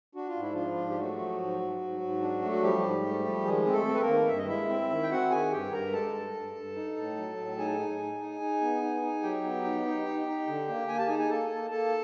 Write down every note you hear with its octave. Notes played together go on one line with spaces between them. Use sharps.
D4 F#4
F4
G#2 E4
F3 D4 F4
G#2
G4
F#3 A3 F#4
F3
G#2
G#2
G#2
G#2
D4
A3
F#4
F3 G3 G4
G#2
A3
F3
D#3 G#3 G#4
C4
A3 A4
C4
B4
A#3 A#4
D#3
G2 E5
D#5
G#3 E4 E5
C4
D#3
G5
C4 F#4 F#5
D#3 G#4 G#5
G2 G4 G5
G2 A#4 A#5
G#3 A4 A5
G2
G2
G2
D#4
A2
F#3
A2
D#4 G#4 G#5
D#4
D#4
D#4
D#4
B3
D#4
D#4
F#3 G4 G5
B3
D#4
D#4
D#4
D#4
D3
A#3
A#3 G#5
A5
D#4 G#4 G#5
G#5
A#3 A4 A5
A#3
A#3 A4 A5